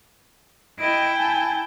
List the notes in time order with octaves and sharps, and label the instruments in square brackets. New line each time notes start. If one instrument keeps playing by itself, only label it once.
[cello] E4 G5 [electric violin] D#5 D7
[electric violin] G#5 A5